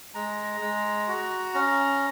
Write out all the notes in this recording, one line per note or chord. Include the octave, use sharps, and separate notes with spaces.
G#3 A#5
G#3
F#4
C#4